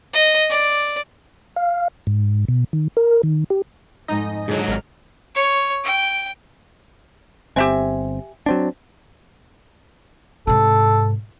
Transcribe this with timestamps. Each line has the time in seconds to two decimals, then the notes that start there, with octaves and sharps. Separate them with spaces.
0.13 D#5
0.50 D5
1.56 F5
2.07 G#2
2.48 B2
2.73 D#3
2.97 A#4
3.23 D#3
3.50 G4
4.08 F2 G#2 D#4 D#5 G#5 A#6
4.48 G#2 D3 F#3 F4 G#4
4.68 G#1 E4 D5 F6
5.35 C#5
5.84 G5
7.56 G1 C4 G4 E5 G#5
8.46 F#3 C4 D4
10.47 G#2 C3 A4